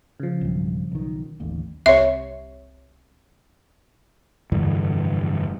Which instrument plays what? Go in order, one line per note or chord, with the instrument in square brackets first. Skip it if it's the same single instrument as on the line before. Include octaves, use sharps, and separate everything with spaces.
[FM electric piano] C#3 F3
[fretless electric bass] B1 G2
B1 D#3
D1 A1 D#2
[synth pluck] C2 C#5 [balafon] E5
[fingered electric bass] F1 G2 D3 E3